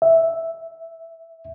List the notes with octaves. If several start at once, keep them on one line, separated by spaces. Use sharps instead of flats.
E5